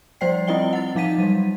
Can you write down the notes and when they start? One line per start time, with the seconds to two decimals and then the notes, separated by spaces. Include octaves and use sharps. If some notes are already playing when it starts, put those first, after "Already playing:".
0.21 F3 G3 C5 D5 G5 C7
0.47 C4 E4 F4 D#5 G5 G7
0.73 F#5 A6
0.95 F3 D#4 F5 B6 D#7
1.18 F#3 G3